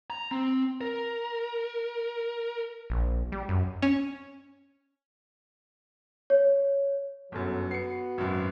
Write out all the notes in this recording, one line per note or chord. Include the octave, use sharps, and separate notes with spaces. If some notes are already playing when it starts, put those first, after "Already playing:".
A#5
C4
A#4
A#1
G3
F#2
C#4
C#5
G1 F#2 F#3 G#4 A4
B3 F#4 C7 C#7
G#1 F#2